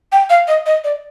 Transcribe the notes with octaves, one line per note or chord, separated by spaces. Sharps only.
G5
F5
D#5
D#5
D5